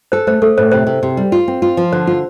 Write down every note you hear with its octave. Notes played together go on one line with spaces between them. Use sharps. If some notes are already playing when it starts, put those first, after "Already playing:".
A4 C5
A3 C5
A3 A4
A2 C5
C3 C5
C3
C3
G3
F4
C4
F4
F3
D3 C5
F4